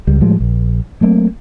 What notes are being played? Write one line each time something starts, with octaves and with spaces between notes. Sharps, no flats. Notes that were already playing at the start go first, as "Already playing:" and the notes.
C#2 G3
A2 F3 G3 G#3
A#1
F#3 A3 A#3 C4